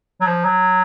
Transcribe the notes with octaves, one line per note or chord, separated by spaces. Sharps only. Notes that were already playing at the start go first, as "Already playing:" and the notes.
F#3
F3
F#3